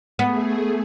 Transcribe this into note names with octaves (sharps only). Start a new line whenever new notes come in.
A3 B3 G#4